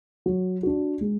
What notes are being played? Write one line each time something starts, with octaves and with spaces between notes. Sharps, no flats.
F#3
D4 F#4
G#3